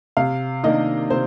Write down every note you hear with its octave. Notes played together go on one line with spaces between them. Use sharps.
C3 F5
D#3 A#3 D4 D#5
C3 C5